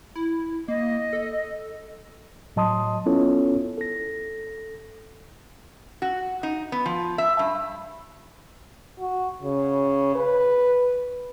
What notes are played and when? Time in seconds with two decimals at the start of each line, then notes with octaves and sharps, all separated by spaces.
0.15 E4
0.68 A#3 D#5
1.13 A4
2.56 A2 F#3 D#5 A5 C6 D#6
3.06 B3 C#4 E4 F4 A4 C#5
3.78 A4 A#6
6.02 F#4
6.43 D#4
6.72 B3
6.86 F3
7.18 E5
7.39 G2
8.99 F#4
9.43 C#3
10.15 B4